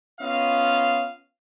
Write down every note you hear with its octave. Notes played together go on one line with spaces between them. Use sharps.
B3 C#4 F4 D#5 F5